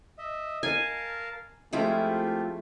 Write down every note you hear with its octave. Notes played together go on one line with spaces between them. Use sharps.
D#5 E5
A#4 F5 G#5 A5
F3 G#3 A3 C4 E4 F4 G4